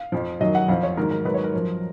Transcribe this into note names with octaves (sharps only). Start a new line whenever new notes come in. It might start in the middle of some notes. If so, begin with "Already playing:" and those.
Already playing: F5
F2 F3
F#2 D#3 F#3 D#5
F#5
F2 F3 F5
C#5
G#2 D#3 F#3 A#4
A#4
G#2 D#3 F#3 B4
C#5
A#4
F#2 F3